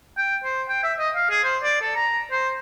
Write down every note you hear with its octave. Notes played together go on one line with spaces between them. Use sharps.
G5
C5
G5
E5
D#5
F5
G#4
C5
D5
A4
A#5
C5